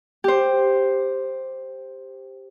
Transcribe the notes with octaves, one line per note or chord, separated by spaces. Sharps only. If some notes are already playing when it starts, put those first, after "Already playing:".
G4 C5